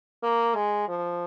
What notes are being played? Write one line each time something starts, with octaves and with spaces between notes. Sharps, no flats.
A#3
G#3
F3